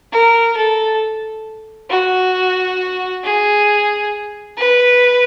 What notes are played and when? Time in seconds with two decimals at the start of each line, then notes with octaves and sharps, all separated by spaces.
0.12 A#4
0.57 A4
1.90 F#4
3.24 G#4
4.57 B4